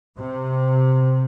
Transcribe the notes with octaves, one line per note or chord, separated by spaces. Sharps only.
C3